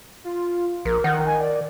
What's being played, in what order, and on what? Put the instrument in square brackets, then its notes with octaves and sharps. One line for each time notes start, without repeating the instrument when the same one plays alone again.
[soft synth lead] F4
[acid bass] A#1 [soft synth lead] A#4
[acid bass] D#3 [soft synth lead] F#5
[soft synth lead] G#5
D5